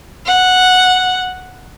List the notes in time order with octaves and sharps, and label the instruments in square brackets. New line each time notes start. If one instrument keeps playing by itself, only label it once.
[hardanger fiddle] F#5